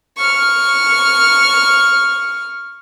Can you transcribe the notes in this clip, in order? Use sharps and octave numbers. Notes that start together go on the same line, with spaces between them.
C#6 F6